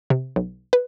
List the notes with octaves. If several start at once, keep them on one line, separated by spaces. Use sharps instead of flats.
C3
B1
B4